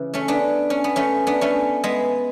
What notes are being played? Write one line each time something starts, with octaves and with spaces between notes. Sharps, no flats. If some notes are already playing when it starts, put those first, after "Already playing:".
Already playing: C#3 E3
A3 C#4
B3 D4
C#4
B3
A3 C#4
B3 D4
A3 C#4
G#3 B3